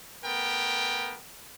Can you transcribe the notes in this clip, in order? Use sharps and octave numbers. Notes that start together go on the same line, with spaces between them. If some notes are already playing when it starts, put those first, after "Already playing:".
A3 B3 A#4 G5